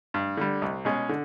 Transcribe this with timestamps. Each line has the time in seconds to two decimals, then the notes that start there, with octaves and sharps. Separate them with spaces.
0.14 G2
0.37 D3 G3
0.62 C2
0.85 B2 G#3 C#4
1.09 D3